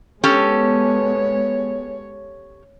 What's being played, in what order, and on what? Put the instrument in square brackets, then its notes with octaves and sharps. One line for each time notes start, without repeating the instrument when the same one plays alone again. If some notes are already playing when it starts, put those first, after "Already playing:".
[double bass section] G#3 B3 [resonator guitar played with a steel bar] C#4 G4 A4 [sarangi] C#5